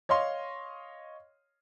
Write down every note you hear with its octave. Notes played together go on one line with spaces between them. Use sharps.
C#5 D#5 F5 C6